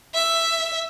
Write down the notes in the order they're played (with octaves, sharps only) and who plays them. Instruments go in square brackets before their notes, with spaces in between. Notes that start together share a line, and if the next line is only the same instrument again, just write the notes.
[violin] E5